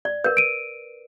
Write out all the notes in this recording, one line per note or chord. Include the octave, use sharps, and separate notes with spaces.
D5
A#4 B4 G6
D7 D#7